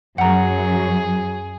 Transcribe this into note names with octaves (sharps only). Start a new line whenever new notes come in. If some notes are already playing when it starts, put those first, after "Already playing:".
F#2 F#3 G#4 F#5 A#5